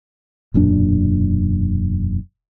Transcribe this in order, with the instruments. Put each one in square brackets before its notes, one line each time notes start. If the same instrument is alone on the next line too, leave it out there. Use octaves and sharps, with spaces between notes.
[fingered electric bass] E1 F#2 A#2 D4